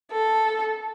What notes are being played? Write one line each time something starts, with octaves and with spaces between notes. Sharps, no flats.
A4